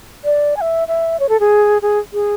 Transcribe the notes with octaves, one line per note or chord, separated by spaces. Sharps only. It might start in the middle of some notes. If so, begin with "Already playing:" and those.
D5
G#5
E5
E5
C#5
A4
G#4
G#4
G#4